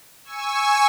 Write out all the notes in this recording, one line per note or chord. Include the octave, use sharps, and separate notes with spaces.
G#5 C#6 E6